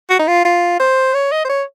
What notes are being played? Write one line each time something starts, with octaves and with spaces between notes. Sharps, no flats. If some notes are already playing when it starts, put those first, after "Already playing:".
F#4
D#4
F4
F4
C5
C#5
D#5
C5
C#5